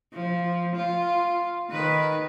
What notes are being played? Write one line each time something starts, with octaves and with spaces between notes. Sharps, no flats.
F3
F4
D#3 B4